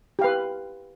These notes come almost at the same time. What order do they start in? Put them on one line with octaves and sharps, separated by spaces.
G4 F5 B4